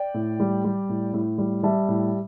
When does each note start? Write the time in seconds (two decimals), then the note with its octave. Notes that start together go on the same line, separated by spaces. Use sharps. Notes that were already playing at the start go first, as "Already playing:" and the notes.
Already playing: D5 G5
0.14 A2
0.40 G3
0.64 G3
0.89 A2
1.14 A2
1.38 G3
1.63 G3 E5 A5
1.89 A2